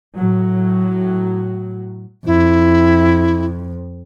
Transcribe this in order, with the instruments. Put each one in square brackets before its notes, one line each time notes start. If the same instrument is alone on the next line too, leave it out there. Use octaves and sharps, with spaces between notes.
[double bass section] A2 F#3
[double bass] F2 [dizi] E4